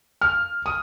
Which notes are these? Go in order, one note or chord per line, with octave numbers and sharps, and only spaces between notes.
F6
D#6